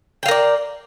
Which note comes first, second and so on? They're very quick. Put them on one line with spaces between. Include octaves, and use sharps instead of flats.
G5 F5 A#4 D5